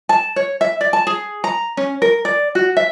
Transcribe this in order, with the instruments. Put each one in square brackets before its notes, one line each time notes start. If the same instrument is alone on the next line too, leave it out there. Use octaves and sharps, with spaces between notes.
[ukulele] A5
C#5
E5
D5
A5
G#4
A#5
C#4
A#4
D5
F#4
E5